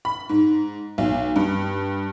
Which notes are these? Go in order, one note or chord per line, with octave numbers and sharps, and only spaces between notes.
B5
G#2
B1
G2